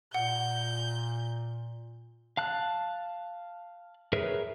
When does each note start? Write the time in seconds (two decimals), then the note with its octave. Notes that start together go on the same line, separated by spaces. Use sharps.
0.14 A#2 F#5 G6
2.37 F5 A5 F#6
4.13 G#4 A#4 B4 C#5 E5